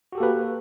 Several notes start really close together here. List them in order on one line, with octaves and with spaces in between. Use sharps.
F#4 G4 A4 A#3 B4